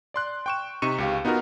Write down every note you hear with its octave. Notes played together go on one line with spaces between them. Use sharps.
D5 C6 F#6
G5 C#6 E7
C3 D#4 C#6 C#7 D#7 E7
C#2 G4 F5
B3 D#4 F4 F#4 A#4